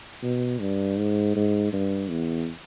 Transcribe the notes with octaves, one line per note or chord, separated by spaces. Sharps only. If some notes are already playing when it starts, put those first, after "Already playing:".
B2
G2
G#2
G#2
G2
E2